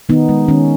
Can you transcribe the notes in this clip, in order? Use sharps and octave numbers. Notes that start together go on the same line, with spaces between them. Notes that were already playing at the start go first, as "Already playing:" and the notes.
D#3 B3 D#4
G#3
D#3 C#4